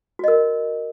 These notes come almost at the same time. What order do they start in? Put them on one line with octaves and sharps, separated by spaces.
F#4 D#5 A#4